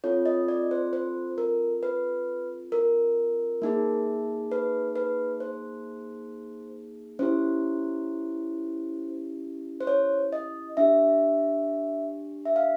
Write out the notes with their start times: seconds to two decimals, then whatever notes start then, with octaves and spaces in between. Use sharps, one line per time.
0.04 C4 F4 A4 C#5
0.26 D#5
0.48 D5
0.71 C5
0.93 C5
1.38 A#4
1.83 B4
2.72 A#4
3.62 A#3 D#4 G#4
4.51 B4
4.96 B4
5.40 C5
7.19 C#4 E4 G4 C5
9.81 C5
9.87 C#5
10.33 D#5
10.77 D4 G4 E5
12.45 E5
12.56 F5